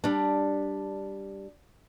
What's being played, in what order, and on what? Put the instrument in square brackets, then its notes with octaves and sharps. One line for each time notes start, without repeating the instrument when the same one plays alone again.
[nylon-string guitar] G3 D4